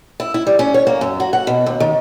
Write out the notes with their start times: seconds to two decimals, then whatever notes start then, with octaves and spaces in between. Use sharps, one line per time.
0.20 E4
0.34 E4
0.47 G3
0.59 C#4
0.74 C#5
0.87 A#3
1.01 F#2
1.20 F#4
1.33 F#5
1.47 B2
1.66 D#2
1.80 D#3